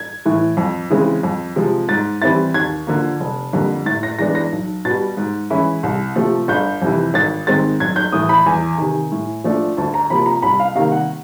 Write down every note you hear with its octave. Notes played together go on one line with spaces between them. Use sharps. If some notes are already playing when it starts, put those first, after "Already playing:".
Already playing: G#6
A2 E3
F2
C#3 E3 G#3 C4
F2
C3 F3 G#3
G#2 A6
E3 G3 C4 E4 A6
D#2 G#6
D3 F3 A#3
F1
F2 D3 G3 A#3
A2 A6
A#6
E3 G#3 B3 D4 A#6
A#6
B1
B2 G3 A6
G#2
E3 G#3 C#4 E4
C2
C3 F3 A3
G1 G6
F2 C3 E3
G#1 A6
G#2 D#3 G#3 C4 A6
B1 G#6
G6
A2 E3 D#6
B5
E2 G#5
C3 D#3
A2
F3 A3 D4
D2 A5
A#5
C3 F3 A#3 B5
A#5
C2 B5
F5
C3 D#3 G3 A#3 F5
F#5